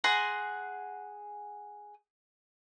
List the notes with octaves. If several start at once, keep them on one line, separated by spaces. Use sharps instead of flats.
G#4 F#5 A#5 C6